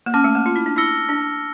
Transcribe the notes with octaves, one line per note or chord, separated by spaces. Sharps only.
A#3
C#4 A5 D6 F6
A3
A#3
F4
E4
D4
E4 E6 A#6 C#7 G7
D4